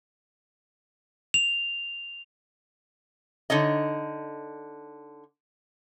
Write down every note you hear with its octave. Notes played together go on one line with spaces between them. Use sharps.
F7
D3 D#4 C#5 D#5